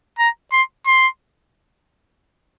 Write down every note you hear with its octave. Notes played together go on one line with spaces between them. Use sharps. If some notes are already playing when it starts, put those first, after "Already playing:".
A#5
C6
C6